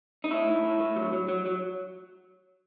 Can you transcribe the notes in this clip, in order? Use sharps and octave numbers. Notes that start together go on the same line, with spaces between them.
D#4
A2 E4
A2
A2
A2
F#3
F#3
F#3
F#3